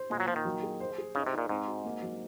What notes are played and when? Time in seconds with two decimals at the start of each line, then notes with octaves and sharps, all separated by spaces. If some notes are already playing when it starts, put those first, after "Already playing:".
Already playing: C5
0.10 A#2 G#3
0.20 F#3
0.28 A#2 F3
0.36 D#3
0.45 F#3
0.63 G#4
0.80 C5
0.98 G#4
1.15 C#3 D#4
1.27 C3
1.33 A#2 D#4
1.49 G#2 C4
1.67 F#4
1.84 A#3
2.02 F#3